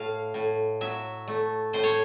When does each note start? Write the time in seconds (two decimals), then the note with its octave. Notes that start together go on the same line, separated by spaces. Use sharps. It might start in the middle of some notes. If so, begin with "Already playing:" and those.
Already playing: A2 F5
0.34 A2
0.81 F#3 E5
1.28 A3
1.73 A2 C5
1.83 C#5